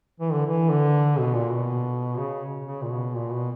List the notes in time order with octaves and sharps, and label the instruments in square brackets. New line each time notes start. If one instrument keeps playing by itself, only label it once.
[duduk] E3
D3
E3
D3
B2
A#2
B2
C#3
C#3
A#2
B2
A#2
B2